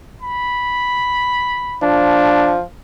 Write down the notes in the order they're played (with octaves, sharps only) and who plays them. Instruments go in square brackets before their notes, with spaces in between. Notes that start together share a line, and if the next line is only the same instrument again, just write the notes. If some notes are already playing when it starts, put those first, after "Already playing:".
[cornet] B5
[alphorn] F3 [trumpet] D4